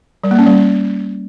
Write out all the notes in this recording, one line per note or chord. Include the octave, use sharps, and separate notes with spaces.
G3
A#3
C#4
G3